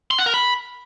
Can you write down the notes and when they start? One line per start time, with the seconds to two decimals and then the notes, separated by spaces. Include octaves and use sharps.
0.11 C6
0.18 F#5
0.26 A#4
0.34 B5